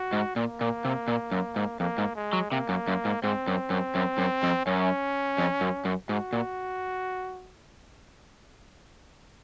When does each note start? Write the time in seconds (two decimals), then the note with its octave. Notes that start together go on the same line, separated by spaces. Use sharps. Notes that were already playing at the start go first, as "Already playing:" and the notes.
Already playing: F#4
0.13 G#2
0.36 A#2 A#3
0.61 A#2
0.85 C3
1.08 A#2
1.32 F#2
1.56 G#2
1.79 F2 A#3
1.98 G#2
2.16 G#3
2.33 F#3
2.51 C3 A#3
2.69 F#2
2.88 F#2
3.05 G#2
3.22 G#2 C4
3.47 F#2
3.70 F#2
3.95 F#2
4.18 F#2
4.43 F2
4.66 F#2 C#4
5.38 F2
5.61 F#2
5.85 F#2
6.09 G#2 F#4
6.33 A#2